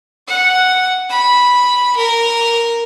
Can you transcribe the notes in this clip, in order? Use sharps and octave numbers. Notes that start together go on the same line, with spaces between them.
F#5
B5
A#4